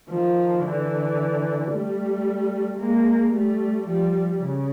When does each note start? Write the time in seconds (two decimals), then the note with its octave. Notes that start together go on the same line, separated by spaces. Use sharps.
0.09 D#3 F3
0.63 D3 E3
1.71 G3 A3
2.79 G#3 A#3
3.34 G3 A3
3.88 F3 G3
4.41 C#3